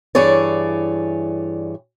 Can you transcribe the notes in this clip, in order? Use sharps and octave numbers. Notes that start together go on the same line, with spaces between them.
G2 E3 G#4 C#5 D5